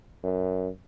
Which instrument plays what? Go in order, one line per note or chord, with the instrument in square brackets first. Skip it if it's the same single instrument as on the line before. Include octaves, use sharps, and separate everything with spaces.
[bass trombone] F#2